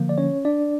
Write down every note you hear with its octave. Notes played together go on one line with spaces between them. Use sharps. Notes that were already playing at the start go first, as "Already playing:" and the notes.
Already playing: D3 F3 A#3
D5
C#4 C#5
D4 D5